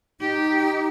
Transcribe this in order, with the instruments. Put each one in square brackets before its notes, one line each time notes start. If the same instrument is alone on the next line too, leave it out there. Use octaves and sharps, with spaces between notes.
[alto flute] D#4 [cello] G4